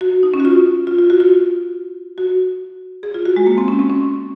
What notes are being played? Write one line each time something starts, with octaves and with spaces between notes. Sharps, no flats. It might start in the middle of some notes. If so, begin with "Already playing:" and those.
F#4
D#4
C#4
F#4
F4
F4
F4
F#4
F4
F#4
G#4
F4
F#4
G#3
A#3
C4
C#4
C4
C#4